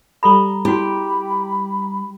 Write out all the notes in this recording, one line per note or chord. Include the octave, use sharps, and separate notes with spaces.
G3 A4 A#5 B5
E4 F#4 G4 B5